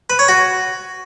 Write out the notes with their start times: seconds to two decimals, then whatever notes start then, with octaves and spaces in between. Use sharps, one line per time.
0.10 B4
0.19 C#5
0.28 F#4